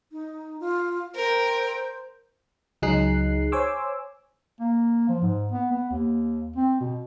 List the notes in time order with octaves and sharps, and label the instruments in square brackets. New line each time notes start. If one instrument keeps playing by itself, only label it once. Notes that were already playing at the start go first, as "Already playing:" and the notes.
[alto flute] D#4
F4
[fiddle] A#4 G5 [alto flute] C5
[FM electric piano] C#2 F#3 D#4 G#4 F#6 C7
C5 C#5 G#5 C6 D6 E6
[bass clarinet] A#3
F3
G#2
B3
B3
D#2
C4
B2